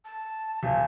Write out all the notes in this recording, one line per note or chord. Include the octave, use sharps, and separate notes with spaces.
A5
D#1